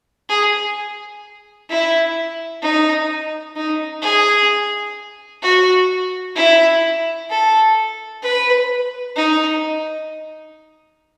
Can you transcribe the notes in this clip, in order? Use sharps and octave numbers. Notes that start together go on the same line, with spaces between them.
G#4
E4
D#4
D#4
G#4
F#4
E4
A4
B4
D#4